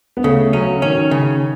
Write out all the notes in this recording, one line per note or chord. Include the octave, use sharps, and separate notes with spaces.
B3
C#3 A3
F#3 C#4
D#3 C#4
C#3